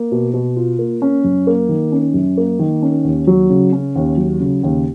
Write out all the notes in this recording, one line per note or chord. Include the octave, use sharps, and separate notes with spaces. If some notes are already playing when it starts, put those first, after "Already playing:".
Already playing: A#3
B2
B2
F4
A#3
C#4
F#2
A#3
D#3
C#4
F#2
A#3
D#3
C#4
D#2
F#3
C#3
C#4
D#2
F#3
C#3
D#2